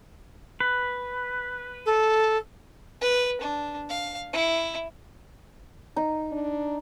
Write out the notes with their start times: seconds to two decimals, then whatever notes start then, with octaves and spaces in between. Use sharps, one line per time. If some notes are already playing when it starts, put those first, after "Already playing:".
0.60 B4
1.85 A4
3.01 B4
3.41 D4
3.90 F5
4.33 E4
5.96 D#4
6.32 D4